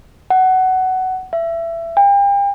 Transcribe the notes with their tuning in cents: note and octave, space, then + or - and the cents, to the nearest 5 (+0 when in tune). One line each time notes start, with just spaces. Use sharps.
F#5 +15
E5 +20
G5 +40